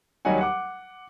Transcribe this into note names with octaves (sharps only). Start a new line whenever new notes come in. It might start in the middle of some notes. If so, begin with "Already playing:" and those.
D#2 F#3 G3 D#4 F#5 G#5
F#5 D6